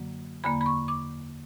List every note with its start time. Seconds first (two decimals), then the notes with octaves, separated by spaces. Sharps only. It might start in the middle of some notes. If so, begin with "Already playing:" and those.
Already playing: F#2 D3 F#3 A#3
0.44 E2 D3 A#3 B5
0.61 B5
0.66 C#6
0.88 D6